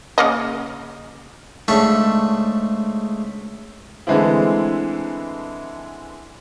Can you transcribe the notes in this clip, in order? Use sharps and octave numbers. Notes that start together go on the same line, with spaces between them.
C#3 A#3 D#5
G#2 C#3 A3 D4 A5 C#6
D3 E3 G#3 A3 C4 E4